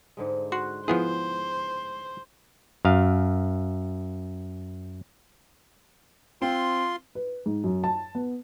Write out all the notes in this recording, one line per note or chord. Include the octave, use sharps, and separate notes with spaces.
G#2 D3 G#3
F#4 C6 F#6
F3 B3 E4 G#4 C5
F#2 F5
C4 F4 C6
B4
G#2
F#2
A5
B3